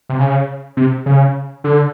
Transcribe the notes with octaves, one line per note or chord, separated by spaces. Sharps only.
C3
C#3
C3
C#3
D3